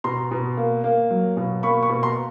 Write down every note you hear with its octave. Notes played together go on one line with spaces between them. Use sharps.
B2 A#5 C6
B2
A#3
A#3
F#3
B2
A#3 B5 C#6
B5 C#6
B2
A#5 C6